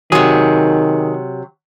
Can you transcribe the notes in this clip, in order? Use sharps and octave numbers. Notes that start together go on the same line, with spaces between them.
C3 D#3 F#3 G#4